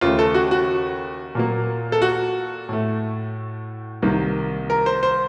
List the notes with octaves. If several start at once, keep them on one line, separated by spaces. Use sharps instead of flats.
D#2 C#3 A3 F4
A4
F#4
F#4
A#2 F#3 A#3
A4
F#4
A2 A3
C2 C3 D#3 A#3
A#4
C5
C5